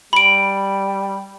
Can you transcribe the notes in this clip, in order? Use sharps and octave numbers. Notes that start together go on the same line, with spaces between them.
G3 B5 D7